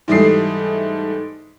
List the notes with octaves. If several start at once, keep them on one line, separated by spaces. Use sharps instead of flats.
G#2 E3 G3 A3 D#6 C7